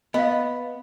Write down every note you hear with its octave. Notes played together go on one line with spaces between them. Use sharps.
B3 D#5 F5